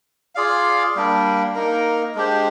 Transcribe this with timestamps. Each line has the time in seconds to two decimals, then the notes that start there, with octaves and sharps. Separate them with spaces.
0.35 F4 G#4 D5 F5
0.96 G3 A#3 D4
1.55 A#3 D#4 A#4
2.15 G#3 D4 G4 C5